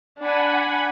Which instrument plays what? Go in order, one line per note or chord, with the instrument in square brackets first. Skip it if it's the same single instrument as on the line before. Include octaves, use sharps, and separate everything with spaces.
[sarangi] D4 [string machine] F#5 G#5 B5